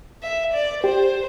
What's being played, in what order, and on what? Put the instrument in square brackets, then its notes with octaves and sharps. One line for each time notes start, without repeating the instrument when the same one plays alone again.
[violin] E5
D5
[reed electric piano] G4 [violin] C5